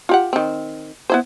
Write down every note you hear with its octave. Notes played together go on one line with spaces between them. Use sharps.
F4 G4 F#5
D#3 C4
B3 E4 C5